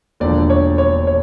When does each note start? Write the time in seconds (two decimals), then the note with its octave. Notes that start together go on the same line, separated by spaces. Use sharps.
0.20 E1 D#2 D3 F3 D5
0.50 C#5
0.78 C#5
1.07 C#5